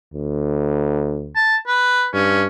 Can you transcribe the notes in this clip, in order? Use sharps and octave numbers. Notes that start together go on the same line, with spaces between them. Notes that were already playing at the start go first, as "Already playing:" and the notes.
D2
A5
B4
G2 C#4